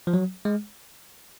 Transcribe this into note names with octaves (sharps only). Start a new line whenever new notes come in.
F3
F#3
G#3